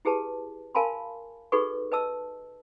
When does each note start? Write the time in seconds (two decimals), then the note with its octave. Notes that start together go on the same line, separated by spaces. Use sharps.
0.05 E4 G4 G#4 B4 A5
0.75 A#4 F5 G#5 A5 B5 C6
1.52 D#4 F#4 G#4 A4 B4 C#6
1.92 B4 D#5 A5 E6